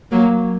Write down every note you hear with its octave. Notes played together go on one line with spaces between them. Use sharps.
F#3 A#3